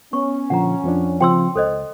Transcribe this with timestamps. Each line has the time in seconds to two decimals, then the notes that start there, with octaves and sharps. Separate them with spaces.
0.13 B3 C#4 C#6
0.50 A#2 D3 F3 F#5 A#5
0.84 F2 F3 D4
1.21 C#3 F3 C4 G5 C6 E6
1.56 C#2 A4 C5 D#5